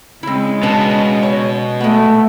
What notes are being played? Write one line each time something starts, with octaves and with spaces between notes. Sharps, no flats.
C#3 G#3 C4 E4
B2 D4 B4 A5
C#5
G#3 A3 B3